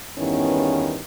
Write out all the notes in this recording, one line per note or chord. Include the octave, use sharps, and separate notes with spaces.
E2 G2 D#3 B3 C#4 E4